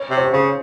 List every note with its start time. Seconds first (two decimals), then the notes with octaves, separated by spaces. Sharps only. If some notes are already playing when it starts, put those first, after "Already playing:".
Already playing: C#5
0.10 C3
0.17 C#5
0.25 C5
0.33 C#3 C#5